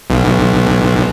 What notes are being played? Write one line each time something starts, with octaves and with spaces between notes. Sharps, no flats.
B1